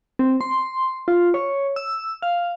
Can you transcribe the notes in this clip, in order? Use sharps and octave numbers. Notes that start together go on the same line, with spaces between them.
C4
C6
F4
C#5
E6
F5